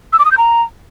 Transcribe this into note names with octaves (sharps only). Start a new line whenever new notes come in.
E6
D6
D#6
G6
A#5